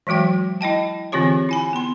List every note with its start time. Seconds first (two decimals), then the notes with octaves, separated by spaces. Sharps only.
0.07 E3 F#3 G#3 F#4 G5
0.61 E4 D#5 G5 A5
1.12 D3 E3 C4 F4 G4 C#5
1.49 E4 G#5 B5
1.73 B3 C6